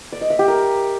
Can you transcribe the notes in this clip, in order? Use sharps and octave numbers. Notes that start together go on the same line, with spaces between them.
D5
D#5
E5
G4
A#4